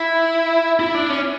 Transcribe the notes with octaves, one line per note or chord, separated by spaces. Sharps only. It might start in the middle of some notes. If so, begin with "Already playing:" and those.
Already playing: E4
E4
D4
C#4